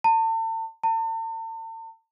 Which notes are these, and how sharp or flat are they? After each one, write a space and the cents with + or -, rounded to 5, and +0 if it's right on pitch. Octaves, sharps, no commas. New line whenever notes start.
A5 +40
A5 +45